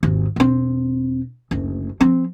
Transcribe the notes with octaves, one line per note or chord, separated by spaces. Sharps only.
G#1 D#2
E1 C4
F#1 D2
F3 C4